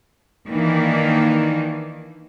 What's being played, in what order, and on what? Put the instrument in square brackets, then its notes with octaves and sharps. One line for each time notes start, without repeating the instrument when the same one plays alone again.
[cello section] D#3 E3 A#3 D4